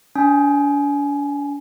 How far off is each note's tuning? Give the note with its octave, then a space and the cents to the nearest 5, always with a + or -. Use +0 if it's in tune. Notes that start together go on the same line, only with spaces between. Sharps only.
D4 -40 G#5 +25